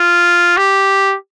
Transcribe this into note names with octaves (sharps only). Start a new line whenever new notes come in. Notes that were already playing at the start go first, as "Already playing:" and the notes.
Already playing: F4
G4